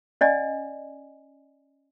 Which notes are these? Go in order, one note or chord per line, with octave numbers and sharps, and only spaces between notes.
C#4 D5 D#5 G#5